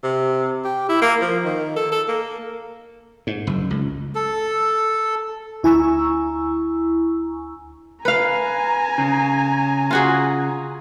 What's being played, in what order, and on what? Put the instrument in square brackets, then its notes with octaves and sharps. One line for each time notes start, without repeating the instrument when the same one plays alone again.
[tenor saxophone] C3
G4
E4
A#3
F3
D#3
A4
A4
A#3
[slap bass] G#2
F#1
C#2
[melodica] A4
[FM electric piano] D2 E4 G#5 A#5 C#6 E6
[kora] B4 F5 [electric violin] G#5 A#5
[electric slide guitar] C#3
[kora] F4 F#4 G#4